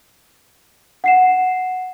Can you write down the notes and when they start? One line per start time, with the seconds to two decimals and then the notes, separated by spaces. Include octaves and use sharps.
1.04 F#5 C7 E7